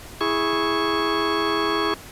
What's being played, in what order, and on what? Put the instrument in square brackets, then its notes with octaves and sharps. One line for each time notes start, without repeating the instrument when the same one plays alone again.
[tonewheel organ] E4 G#4 C#6